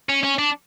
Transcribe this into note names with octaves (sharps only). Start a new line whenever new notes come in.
C#4
C#4
D4